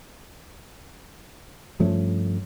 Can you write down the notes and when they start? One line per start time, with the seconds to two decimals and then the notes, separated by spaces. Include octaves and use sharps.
1.80 G2 F3 A3 C#4